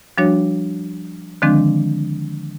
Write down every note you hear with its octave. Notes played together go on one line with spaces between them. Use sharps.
F3 G3 D4 F#4 C#5
D3 D#3 F3 G#3 C4 D4